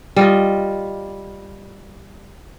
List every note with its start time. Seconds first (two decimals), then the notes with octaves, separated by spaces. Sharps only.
0.16 G3 F4 D#5